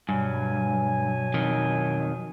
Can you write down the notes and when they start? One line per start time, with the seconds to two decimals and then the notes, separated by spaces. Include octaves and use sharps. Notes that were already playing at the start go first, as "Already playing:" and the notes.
0.09 G2 B2 F#3 G#5
1.34 F2 D#3